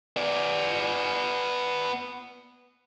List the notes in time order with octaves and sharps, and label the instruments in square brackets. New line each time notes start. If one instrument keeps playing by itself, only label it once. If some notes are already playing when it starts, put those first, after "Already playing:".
[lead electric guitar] B3 D5